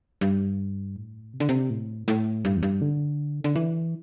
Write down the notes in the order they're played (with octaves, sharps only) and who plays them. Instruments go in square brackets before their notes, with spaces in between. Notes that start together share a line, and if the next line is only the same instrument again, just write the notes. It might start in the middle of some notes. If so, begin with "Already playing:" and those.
[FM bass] G2
A2
C3
D3
C3
A2
A2
G2
E2
G2
D3
D3
E3